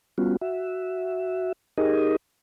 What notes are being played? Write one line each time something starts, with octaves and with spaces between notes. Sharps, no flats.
G3 B3 C#4 F4 F#4
F#4 E5
D#4 G4 G#4 A#4 D#5